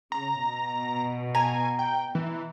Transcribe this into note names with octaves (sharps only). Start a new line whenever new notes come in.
C#3 A#5
B2
G#5 A#5
G5
E3